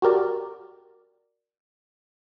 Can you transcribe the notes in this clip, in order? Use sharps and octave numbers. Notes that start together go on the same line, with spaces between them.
F#4 G4 A#4 D5